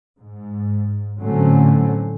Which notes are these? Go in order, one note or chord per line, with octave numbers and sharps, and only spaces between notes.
G#2
A2 D3 F#3 A3 C4 C#4